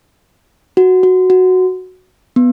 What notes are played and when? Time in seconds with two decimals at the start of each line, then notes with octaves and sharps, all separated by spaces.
0.77 F#4
1.03 F#4
1.30 F#4
2.36 B3